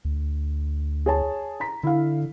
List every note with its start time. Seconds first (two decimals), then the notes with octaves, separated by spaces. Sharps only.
0.05 D2
1.06 G#4 C#5 A5
1.60 A#5 B6
1.83 D3 E4 F5